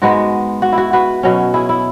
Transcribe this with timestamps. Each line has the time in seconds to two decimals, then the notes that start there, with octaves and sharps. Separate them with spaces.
0.02 G#2 G#3 B3 F#4
0.62 F#4
0.72 E4
0.78 F#4
0.93 F#4 B4
1.23 B2 F#3 C#4
1.54 E4 G#4
1.69 E4